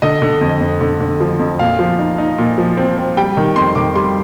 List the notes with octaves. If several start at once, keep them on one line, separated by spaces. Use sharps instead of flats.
D3 D#5
D3
F2
F2
D3
D3
F3
F2
A#2 F5
F3
D#4
D#4
A#2
F3
C4
C4
G3 G5
D#3
F2 C6
D#3 D6
G3 C6